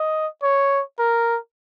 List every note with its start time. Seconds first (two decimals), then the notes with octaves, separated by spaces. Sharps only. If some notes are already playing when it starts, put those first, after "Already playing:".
Already playing: D#5
0.43 C#5
0.99 A#4